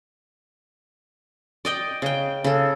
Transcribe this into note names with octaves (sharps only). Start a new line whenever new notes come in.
D5 D#5 G5
C#3 G5
C#3 A4